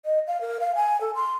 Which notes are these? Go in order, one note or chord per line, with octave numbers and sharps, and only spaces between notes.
D#5
F5
A#4
F5
G#5
A4
C6